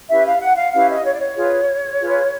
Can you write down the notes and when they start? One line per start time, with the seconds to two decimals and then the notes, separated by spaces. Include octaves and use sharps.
0.09 C#4 E4 G4 B4 E5
0.25 F5
0.41 F#5
0.56 F5
0.73 C#4 E4 G4 B4 F5
0.89 D#5
1.05 C#5
1.13 D5
1.20 C#5
1.36 F4 G#4 B4
2.00 F4 G#4 B4